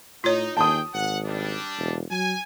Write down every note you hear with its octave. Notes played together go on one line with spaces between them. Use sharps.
A2 D#4 F4 C#5
D#2 G#4 G5 A5 D#6
G#1 F#5
G3 D4
E1
F#3 G#5